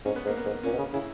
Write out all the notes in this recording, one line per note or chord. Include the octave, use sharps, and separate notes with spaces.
G#2 C#4
B3
G#2
A#3
B3
G#2
A#2 C#4
B2
C#3
C#3 E4